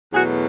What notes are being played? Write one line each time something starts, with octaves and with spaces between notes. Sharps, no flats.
E2 B2 F#3 A3 F#4 G#4